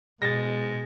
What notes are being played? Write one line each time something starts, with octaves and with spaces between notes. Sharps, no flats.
B2 G#3 A6 A#6